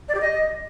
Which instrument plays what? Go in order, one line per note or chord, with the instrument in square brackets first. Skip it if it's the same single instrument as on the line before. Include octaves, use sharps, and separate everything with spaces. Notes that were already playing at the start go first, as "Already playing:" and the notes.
[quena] D5
G4
D#5